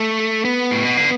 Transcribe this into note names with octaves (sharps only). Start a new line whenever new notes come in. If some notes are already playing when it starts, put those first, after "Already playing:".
Already playing: A3
B3
A2
B2
D3